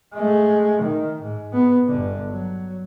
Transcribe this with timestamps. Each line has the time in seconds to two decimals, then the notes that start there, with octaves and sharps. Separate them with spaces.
0.14 G#3 A3
0.81 D#3
1.22 G#2
1.53 B3
1.88 G1 D3
2.30 F#3